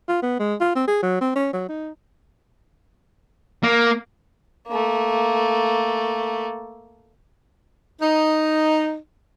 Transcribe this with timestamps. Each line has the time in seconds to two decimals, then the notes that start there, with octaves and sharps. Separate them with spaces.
0.08 F4
0.23 B3
0.39 G#3
0.61 F4
0.75 C4
0.88 G#4
1.03 F#3
1.21 C4
1.35 C#4
1.53 F#3
1.69 D#4
3.63 A#3
4.68 A3 A#3
8.01 D#4